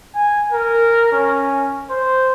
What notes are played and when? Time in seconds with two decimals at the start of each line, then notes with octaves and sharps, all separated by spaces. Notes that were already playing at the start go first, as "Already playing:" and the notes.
0.15 G#5
0.52 A#4
1.12 C#4
1.90 C5